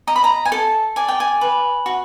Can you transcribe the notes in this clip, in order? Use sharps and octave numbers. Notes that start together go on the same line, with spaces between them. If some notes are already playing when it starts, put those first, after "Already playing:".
D#5 A#5
B5
A#5
G#5
A4 A5
D5 G#5
G5
G#5
B4
F#4